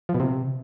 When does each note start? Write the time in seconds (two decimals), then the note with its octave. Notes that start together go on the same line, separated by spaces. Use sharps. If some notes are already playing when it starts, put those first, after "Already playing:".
0.09 F3
0.14 B2
0.20 C3